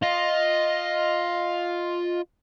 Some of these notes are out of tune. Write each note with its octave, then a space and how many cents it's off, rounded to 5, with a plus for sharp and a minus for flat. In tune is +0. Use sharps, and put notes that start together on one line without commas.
F4 +5 D#5 +0